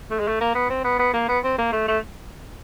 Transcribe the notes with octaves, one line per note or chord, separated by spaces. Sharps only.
A3
G#3
A3
A#3
B3
C4
B3
B3
A#3
B3
C4
A#3
A3
A3